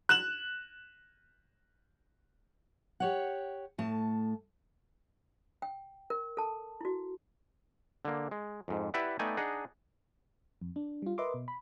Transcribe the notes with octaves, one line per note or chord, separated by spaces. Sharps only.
F#6 E7 F#7
G4 C#5 F#5
A2 A3 A5
G5
A#4
A4 A5
E4 F#4
D3 A#3
G#3
F2 G#2
E4 G4 B4 D5 E5 F#5
A3 B3 D#4 D5 G5 G#5
D4 D#4 G#4 D#5 F#5
F2
D4
G3 F4
A#4 B4 D#5 E5 C6 D6
B2
B5